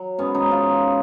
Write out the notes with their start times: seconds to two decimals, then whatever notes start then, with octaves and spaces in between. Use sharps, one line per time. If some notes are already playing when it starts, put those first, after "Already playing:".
Already playing: F#3
0.18 G#2 B3 C#4
0.34 C#4 D#4
0.43 G#2
0.51 D#4 F4
0.69 E3